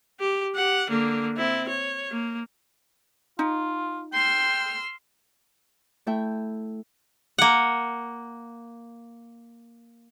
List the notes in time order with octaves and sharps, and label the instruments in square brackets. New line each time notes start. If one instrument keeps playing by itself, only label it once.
[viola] G4
G4 F#5
D3 A#3
C4 E4
C#5
A#3
[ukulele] D#4 [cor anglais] F4
[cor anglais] G5 [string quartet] C6 E6 F6
[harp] A3 E4 E5 G5
[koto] A#3 F#5